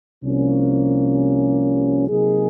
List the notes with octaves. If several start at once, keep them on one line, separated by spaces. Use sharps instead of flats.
C2 C3 F3 A#3 C#4
C3 F#3 A#3 D#4 G#4